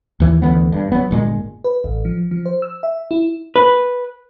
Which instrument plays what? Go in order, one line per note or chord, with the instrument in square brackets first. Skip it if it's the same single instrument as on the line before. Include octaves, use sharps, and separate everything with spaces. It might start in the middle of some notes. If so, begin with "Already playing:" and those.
[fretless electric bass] D#2 E3
D2 E3 F3 B3
G2
F#3 B3
G1 A#2 G#3
[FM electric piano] B4
A1
F3
F3
C5
E6
E5
E4
[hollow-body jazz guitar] B4